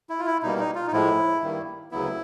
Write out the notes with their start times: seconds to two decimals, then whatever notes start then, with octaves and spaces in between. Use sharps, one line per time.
0.10 E4
0.19 F4
0.26 E4
0.43 B2 G3 A#3 D#4
0.59 D#4
0.75 F4
0.87 D#4
0.92 A2 F3 G#3 E4
1.41 G2 D#3 G3 A#3
1.91 D2 C#3 F#3 B3 E4